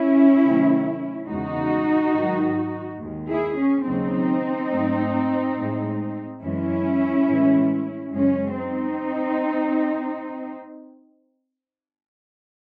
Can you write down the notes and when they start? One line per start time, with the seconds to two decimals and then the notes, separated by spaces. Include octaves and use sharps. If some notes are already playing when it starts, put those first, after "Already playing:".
Already playing: C#4 E4
0.43 C3 D#3 F#3 A3
1.29 E2 C#3 G#3 D#4 F#4
2.15 G#2 D#3 F#3
3.00 D#2 D#3 G#3
3.29 E4 G#4
3.57 C#4
3.86 D#2 C#3 F#3 C4 D#4
4.72 G#2 F#3 A3
5.57 A2 G#3
6.43 F#2 E3 G#3 C#4 E4
7.28 A2 E3 G#3
8.14 F#2 C#3 G#3 C#4
8.57 C4 D#4